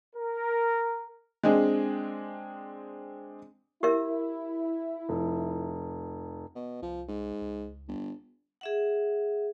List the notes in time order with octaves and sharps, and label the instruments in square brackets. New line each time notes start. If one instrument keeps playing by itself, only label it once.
[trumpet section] A#4
[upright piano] G#3 C4 D4 G#4
[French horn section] E4 [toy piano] G4 A#4 E5
[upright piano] F1
[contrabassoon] B2
[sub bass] C2 [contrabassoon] F3
[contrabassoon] G#2
[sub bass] C#2
[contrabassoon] G1
[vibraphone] G#4 E5 F#5